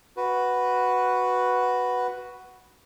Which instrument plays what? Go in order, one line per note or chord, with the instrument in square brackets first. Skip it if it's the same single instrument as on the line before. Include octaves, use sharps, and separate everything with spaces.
[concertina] F#4 B4